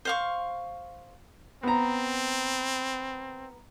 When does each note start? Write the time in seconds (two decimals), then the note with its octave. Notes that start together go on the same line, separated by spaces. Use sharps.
0.05 C5 F5 C#6
1.63 B3 C4 A#5